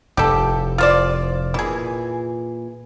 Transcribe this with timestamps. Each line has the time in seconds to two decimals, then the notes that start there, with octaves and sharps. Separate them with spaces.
0.17 F1 A2 G4 A4
0.78 F4 C5 D5
1.54 A#2 E3 G#4